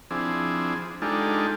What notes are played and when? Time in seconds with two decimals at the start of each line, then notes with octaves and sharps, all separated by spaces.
0.11 F3 C4 D4 E4 G#4
1.02 G#3 D4 D#4 F4 G4 A4